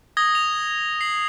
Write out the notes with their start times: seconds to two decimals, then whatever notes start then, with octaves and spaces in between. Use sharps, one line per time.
0.17 D#6 G#6 A#6 G7
0.35 F7
1.01 C7 F#7